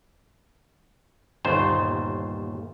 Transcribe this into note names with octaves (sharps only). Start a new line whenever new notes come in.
G1 D#2 A#2 C5